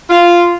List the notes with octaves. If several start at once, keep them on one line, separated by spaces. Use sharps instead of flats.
F4